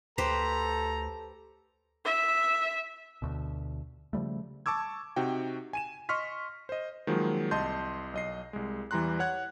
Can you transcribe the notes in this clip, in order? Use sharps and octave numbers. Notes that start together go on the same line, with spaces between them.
D2 G4 A4 B4 C5 A#5
E5
D2 B2
C#3 F3 G3 A3
A5 C#6 D6 E6 G#6
C3 D#4 F#4 G5
G#5 D#7 E7
D#5 C6 C#6 F6 B6
C5 D#5
D#3 F3 F#3 G#3 A#3
C2 D#5 A5 C6 G6
B1 D#5 C7
C2 G#3
E2 E3 G3 A#5 C6 F#6
C#5 F#5 F#6 G#6